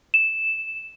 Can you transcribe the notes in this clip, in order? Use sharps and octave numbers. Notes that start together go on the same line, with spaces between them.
E7